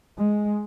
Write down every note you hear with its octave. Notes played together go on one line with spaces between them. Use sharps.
G#3